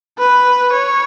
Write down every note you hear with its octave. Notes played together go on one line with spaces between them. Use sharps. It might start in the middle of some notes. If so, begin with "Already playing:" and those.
B4
C#5